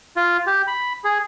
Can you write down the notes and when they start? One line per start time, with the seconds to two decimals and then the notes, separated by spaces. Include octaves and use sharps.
0.16 F4
0.47 G4
0.67 B5
1.04 G#4